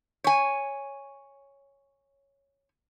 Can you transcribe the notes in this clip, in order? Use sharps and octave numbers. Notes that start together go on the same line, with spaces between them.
C#5 G#5